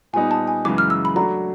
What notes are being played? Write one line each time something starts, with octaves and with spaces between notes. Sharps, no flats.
A#2 G3 B3 D#4 G#5
A5
G#5
F#2 C#3 E3 G#3 D6
F6
E6
B5
F#3 A3 D4 F#4 A#5